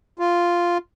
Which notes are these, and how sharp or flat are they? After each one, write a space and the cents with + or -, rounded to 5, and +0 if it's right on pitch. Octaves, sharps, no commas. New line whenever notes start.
F4 -5